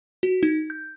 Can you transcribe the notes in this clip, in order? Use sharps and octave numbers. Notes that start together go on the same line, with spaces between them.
F#4
D#4
G6